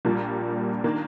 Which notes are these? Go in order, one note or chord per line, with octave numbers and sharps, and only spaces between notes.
A#1 A#2 G3 A#3
D#3 A#3 D4